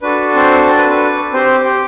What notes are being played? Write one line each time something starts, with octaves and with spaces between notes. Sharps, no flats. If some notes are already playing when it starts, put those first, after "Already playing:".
D4 F#4 A4 B4
C4 C5
C4 C5
B4
B4
C4 G4 C5
G4 G5